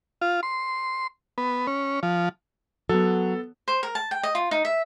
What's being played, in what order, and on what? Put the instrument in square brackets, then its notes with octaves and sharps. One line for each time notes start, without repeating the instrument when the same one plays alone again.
[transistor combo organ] F4
C6
B3
C#4
F3
[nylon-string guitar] F#3 [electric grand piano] B3 A4
[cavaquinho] C5
A#4
A5
G5
D#5
F4
D#4
E5